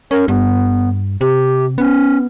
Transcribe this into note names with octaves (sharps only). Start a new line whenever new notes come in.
C#4 A#4
G2 B3
C3 G4
B3 C#4